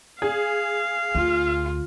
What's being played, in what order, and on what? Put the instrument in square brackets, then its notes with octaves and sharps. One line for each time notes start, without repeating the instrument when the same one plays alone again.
[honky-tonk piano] G#4 [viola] F5
[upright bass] D2 [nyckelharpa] F4